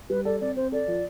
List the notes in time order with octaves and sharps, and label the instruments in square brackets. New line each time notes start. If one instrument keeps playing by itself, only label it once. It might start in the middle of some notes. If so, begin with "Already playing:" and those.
[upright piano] G3 [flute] B4
[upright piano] A4 [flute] D5
[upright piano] C4 [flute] D5
[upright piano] C4 [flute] C5
[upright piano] A4 [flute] D5
[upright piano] F3